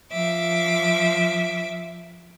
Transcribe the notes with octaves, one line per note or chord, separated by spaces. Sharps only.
F3 E5 D6